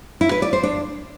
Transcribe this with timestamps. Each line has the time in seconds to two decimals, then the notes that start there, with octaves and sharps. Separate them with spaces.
0.21 E4
0.32 B4
0.42 D5
0.53 C5
0.63 D4